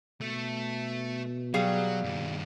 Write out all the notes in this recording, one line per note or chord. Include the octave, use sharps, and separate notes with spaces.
B2 A3
F#3 G3 G#4 F5
G2 D#3